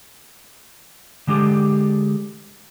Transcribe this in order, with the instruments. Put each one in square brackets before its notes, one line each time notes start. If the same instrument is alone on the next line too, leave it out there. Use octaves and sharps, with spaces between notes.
[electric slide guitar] D3 G#3 D4 G4 A4